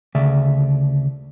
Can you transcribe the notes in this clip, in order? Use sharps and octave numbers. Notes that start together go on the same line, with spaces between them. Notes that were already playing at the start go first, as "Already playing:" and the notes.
D2 C#3 D5 E5